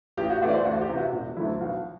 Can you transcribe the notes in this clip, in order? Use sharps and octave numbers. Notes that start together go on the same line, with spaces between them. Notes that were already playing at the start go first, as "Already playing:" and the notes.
A1 G4
F#4
A2 E3 A3 F#4
D5
C5
D2 F#4
G4
C3 E3
F#4
E1
D2 D3 F#3 E4
B1 F#4